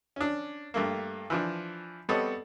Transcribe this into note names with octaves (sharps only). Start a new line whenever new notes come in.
C#4 D4
G2 A3 A#3
E3 F3 D4
G3 B3 C4 A4 C#5 D#5